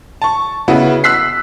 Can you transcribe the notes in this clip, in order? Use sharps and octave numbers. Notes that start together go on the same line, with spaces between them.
A5 C#6
C#3 B3 E4 F#4
E6 F#6 B6 C7